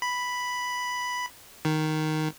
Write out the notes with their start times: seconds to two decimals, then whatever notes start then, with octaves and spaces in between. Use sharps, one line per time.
0.02 B5
1.65 D#3